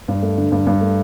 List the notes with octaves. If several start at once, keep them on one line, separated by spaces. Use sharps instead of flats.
G2
A3
D3
G2
G2
A3